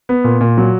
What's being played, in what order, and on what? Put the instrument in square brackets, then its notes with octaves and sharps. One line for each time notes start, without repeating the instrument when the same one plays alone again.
[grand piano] B3
A#2
A#2
F#3